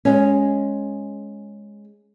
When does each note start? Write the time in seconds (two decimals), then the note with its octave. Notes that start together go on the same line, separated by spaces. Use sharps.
0.05 G#3 C#4